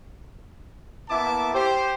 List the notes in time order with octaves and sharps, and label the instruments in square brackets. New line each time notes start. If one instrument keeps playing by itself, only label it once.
[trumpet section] A#3 B3 E4 E5 A5 D6
G4 C5